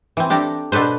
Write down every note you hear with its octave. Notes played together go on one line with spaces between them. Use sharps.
E3 C4
D4 G4 A4 A#5
B2 D4 A4 B4 C5